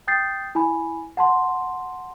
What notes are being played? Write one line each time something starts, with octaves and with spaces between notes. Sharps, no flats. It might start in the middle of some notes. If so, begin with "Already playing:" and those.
G5 D#6 G6 A6 C7
E4 G#5 B5
F#5 A5 C6